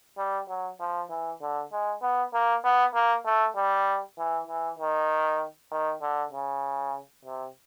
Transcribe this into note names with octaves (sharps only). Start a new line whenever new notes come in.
G3
F#3
F3
E3
D3
G#3
B3
A#3
B3
A#3
A3
G3
E3
E3
D#3
D#3
D3
C#3
C3